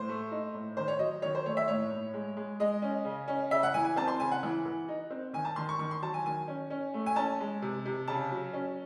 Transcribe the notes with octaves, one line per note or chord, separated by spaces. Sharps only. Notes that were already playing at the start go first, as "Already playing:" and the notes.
Already playing: A2 C5
A3
D#4
A2
D#3 C5
C#5
F#3 D#5
D#3 C#5
C5
A3 C#5
E5
A2 C#5
A2
G#3
G#3
G#3 D#5
C#4
C#3
C#4
C#3 E5
F#5
E3 G#5
G#5
C4 A5
C6
C#3 G#5
F#5
E3
E3
D#4
C4
D#3 G#5
A5
D#3 C6
C#6
D#3 C#6
C6
F#3 A5
G#5
D#3 G#5
C#4
C#4
A3
G#5
C#4 A5
G#3
C3
C3
C#3 A5
F#3
C#4